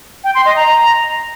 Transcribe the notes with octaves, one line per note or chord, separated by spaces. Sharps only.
G5
C6
D#5
A#5